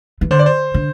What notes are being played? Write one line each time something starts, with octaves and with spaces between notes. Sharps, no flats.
E3
D3 C5
D5
C5
D3